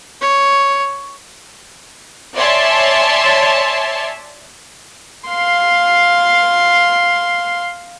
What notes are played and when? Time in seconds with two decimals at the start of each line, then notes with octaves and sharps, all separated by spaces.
0.21 C#5
2.37 C#5 D5 E5 G#5 A5 C6
5.28 F5 C6